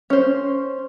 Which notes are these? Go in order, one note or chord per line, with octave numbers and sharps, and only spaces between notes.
C#4 C5